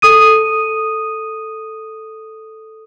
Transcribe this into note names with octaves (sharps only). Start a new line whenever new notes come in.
A4 D#6 D#7